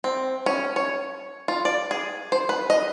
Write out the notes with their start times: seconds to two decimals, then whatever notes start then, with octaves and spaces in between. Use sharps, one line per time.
0.04 C4
0.46 C#4
0.76 C#5
1.48 F4
1.65 D5
1.91 G#4
2.32 C5
2.49 B4
2.70 D#5